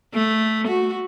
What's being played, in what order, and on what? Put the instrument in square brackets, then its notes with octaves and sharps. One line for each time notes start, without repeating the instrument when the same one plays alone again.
[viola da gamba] A3
F#4